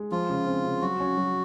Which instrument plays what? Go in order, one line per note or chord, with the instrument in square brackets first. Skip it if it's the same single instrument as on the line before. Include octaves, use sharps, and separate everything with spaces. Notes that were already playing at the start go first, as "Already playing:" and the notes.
Already playing: [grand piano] G#3
[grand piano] F3 [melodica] F4
[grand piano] C#3
C4
C#3
[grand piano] F#3 [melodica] F#4
[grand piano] C#4
F#3